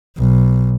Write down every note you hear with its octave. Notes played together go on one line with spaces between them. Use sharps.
B1